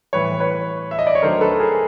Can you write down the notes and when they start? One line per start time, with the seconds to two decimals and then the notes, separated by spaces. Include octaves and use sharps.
0.13 A2 E3 G3 B4 C#5
0.40 B4 C#5
0.91 E5
0.99 D#5
1.07 D5
1.15 C#5
1.22 D#3 F#3 A3 D4 A#4 C5
1.41 A4 B4
1.60 G#4 A#4